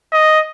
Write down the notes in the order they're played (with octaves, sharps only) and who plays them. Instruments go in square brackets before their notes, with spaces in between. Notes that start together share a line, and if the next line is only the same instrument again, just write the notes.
[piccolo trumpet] D#5